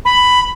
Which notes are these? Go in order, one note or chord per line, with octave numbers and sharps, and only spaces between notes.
B5